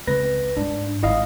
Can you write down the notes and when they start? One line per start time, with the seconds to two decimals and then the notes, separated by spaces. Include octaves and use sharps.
0.07 C#2 C4 B4 A#6
0.57 G#2 D4
1.03 G#1 G#3 E4 D#5 F5